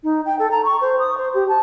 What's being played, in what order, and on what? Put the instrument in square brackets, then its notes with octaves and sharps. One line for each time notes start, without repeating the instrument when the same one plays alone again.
[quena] D#4
G5
A4
A#5
C#6
C5
D#6
C5
G4
A5